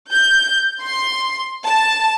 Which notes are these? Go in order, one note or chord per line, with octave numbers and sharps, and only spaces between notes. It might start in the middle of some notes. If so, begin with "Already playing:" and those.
G6
C6
A5